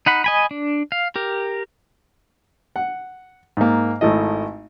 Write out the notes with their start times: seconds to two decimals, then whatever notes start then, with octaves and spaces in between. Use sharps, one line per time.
0.06 D#4 F#5 B5
0.24 D#5 G#5 B5
0.51 D4
0.92 F5
1.16 G4 A#4
2.76 F#5
3.57 G#2 A#3
4.01 G#1 A3 E4 D#5